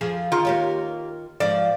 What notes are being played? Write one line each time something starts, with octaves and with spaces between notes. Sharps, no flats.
F2 F3 G#4
D#3 F4
A#3 G4 C#5
G#2 F3 D5